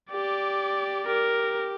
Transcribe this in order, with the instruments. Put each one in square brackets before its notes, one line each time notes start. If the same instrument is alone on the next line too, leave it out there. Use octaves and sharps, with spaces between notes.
[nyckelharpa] G4 [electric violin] D5
[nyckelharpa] G4 [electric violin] A#4